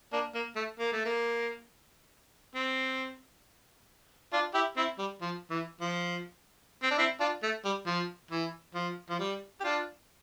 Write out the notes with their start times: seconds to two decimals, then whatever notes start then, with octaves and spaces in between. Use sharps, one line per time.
0.13 A#3 D4
0.34 A#3
0.56 A3
0.79 A#3
0.93 A3
1.05 A#3
2.55 C4
4.33 D4 F4
4.54 E4 G4
4.76 C4 E4
4.98 G3
5.21 F3
5.50 E3
5.81 F3
6.83 C4
6.91 D4
6.98 C4 E4
7.20 D4 F4
7.43 A3
7.65 G3
7.86 F3
8.31 E3
8.75 F3
9.10 F3
9.19 G3
9.60 G4
9.64 D4 F4